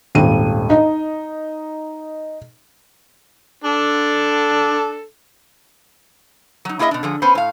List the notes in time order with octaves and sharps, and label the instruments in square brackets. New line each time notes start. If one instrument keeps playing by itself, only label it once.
[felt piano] D#1 G#1 D#7
D#4 D#5
[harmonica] D4 A4
[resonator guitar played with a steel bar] F#3 D#4
A#3 E4 G#4 C#5 D#5 E5
B2 D4
D3 F3 G#4
B3 C#4 B4 C5
A2 F5